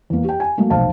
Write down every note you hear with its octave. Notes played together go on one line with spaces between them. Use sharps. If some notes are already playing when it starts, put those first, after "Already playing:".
E2 A#3
G4 G5
G#5
F#3 A3 A#3
F1 B1 C5 F5 A5